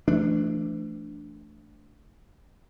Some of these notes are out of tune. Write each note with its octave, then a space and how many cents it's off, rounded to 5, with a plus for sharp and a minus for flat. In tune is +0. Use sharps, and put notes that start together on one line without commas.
E3 +40 A3 +5 D4 +0